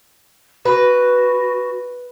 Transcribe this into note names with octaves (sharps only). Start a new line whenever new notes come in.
F#4 B4